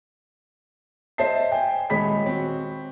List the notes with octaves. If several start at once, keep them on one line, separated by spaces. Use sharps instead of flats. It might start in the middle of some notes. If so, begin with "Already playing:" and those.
C5 D#5 E5 A5 C7
G5 G#5
D#1 G#3 G#4 C#5 B5 B6
C4 F#4